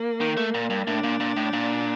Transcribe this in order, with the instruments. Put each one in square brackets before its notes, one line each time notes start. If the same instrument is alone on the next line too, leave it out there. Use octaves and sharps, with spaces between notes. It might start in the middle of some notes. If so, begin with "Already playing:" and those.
Already playing: [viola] A#3
[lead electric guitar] D#3
A3
A#2
G2
[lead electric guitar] A2 [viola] D4
[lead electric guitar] A#2
A#2
A2
A#2